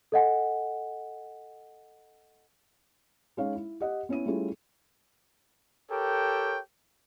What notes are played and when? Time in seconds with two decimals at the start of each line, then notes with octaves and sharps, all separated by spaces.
0.12 A4 D#5 F#5 G#5
3.37 G#3 C#4 D#4 C#5 F5
3.55 E4
3.80 G4 D#5 F#5
4.09 B3 C#4 E4 D#7
4.26 G3 A3 C#4 E4 F4 G#4
5.90 G4 A4 A#4 C#5 G5